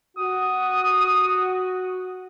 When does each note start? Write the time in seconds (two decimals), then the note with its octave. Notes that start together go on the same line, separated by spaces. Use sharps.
0.18 F#4 D#6